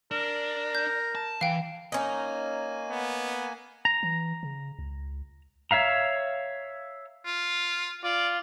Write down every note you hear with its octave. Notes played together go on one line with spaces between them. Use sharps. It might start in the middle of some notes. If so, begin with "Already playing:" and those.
D4 A#4
G6
A5
E3 F5 G5
A#3 C#4 D#4 G#5
B3
A#5
E3
C#3
C#2
C#5 E5 F5 A#5
F4
F4 D5